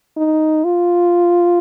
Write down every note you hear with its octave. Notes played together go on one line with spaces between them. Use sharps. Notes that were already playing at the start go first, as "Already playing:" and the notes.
D#4
F4